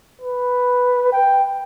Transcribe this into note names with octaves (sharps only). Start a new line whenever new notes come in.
B4
G5